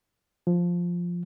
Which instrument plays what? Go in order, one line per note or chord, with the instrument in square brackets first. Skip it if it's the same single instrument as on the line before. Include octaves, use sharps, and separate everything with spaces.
[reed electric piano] F3